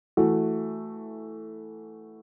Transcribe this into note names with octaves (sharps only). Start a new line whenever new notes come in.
E3 A3 F#4